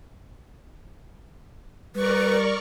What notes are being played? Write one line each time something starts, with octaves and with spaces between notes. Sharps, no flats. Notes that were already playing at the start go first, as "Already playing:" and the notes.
G3 A#4 B4 D5 C#6